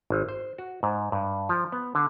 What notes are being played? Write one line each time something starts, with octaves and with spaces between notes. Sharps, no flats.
G#1
C5
F#4
G#2
G2
F3
B3
D3